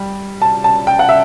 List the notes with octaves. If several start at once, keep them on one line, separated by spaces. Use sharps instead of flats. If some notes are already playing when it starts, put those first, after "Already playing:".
Already playing: G3
A5
A5
G5
F#5
E5